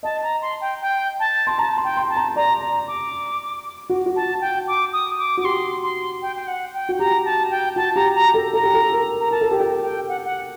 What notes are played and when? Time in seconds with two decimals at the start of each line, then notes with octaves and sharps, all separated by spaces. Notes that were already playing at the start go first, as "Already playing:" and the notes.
0.03 D#5 A5
0.23 A#5
0.42 C6
0.61 G5
0.81 G5
1.19 A5
1.47 C6
1.58 A5 A#5
1.77 C6
1.84 G5
1.97 C6
2.10 A5
2.16 A#5
2.35 D5 A#5
2.61 A#5
2.87 D6
3.90 F#4
4.06 F#4
4.16 A5
4.41 G5
4.67 D6
4.93 D#6
5.19 D6
5.37 F#4 D6
5.44 G4 C6
5.83 C6
6.22 G5
6.36 G5
6.47 F#5
6.73 G5
6.89 F#4
6.99 G4 A#5
7.25 A5
7.51 G5
7.76 F#4 A5
7.95 G4 A#5
8.15 A#5
8.34 A4
8.53 A4 A#5
8.64 G4
8.74 A4
8.92 A#4
9.20 A#5
9.31 A#4 A5
9.41 A4
9.51 G4
9.57 A4 G5
9.82 G5
10.08 F#5
10.25 F#5